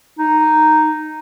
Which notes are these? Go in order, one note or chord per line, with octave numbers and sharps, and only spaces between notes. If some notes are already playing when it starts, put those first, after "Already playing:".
D#4